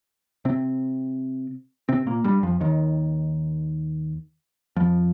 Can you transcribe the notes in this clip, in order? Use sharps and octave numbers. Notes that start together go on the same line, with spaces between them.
C3 C4
C3 C4
A#2 A#3
G2 G3
F2 F3
D#2 D#3
F2 F3